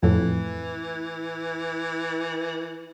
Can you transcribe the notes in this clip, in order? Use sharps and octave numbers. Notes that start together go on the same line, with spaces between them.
F2 A2 E3